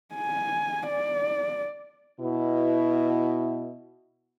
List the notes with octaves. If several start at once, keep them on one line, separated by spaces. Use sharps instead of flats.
G#5
D5
B2 E4